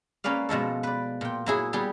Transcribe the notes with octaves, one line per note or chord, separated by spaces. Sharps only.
A#3 C#4 B4 D5 F5
B2 F3 G#3 A4
B4 D5
A#2 G5
F#3 E4 G#4
G3 B3 G4 G#4